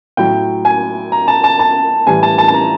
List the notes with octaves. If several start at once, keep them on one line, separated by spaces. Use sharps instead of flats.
A2 F#3 G5
G#5
A#5
A5
A5
A5
A2 E3 G3 G#5
A5
A5
A5
A#5